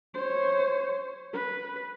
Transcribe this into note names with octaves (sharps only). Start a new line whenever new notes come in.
C5 C#5
B4